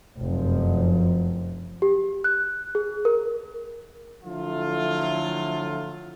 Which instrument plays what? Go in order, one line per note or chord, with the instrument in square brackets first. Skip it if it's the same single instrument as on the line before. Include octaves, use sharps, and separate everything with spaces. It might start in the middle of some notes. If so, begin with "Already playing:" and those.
[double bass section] F1 F#2 F3
[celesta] G4
F#6
G#4
A#4
[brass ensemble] D3 F3 F#3 A3 E4 F4